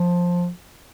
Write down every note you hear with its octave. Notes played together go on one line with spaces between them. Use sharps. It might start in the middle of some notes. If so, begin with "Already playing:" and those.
Already playing: F3